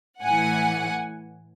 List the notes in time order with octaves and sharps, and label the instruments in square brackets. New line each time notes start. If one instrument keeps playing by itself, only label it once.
[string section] A2 E3 F#5 G#5